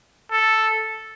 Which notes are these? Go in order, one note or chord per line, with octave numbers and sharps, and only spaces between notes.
A4